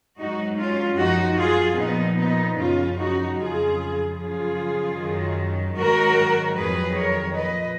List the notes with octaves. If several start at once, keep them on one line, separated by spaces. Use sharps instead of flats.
G#2 F#3 D#4 F#4
C#4 F4
F#2 F3 D#4 F#4
F4 G#4
A#2 F3 B3 D#4
B3 D#4
F#2 C#3 F3 C#4 F4
D#4 F#4
F2 C#3 F#3 F4 G#4
F#2 C#3 F3 F4 G#4
F#2 D#3 F#3
G#2 D#3 F#3 F#4 A#4
F2 D#3 F#3 G#4 B4
A#4 C#5
A#2 F3 B4 D#5